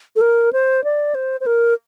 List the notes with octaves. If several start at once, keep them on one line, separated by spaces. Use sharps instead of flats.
A4
A#4
C5
D5
C5
C5
A#4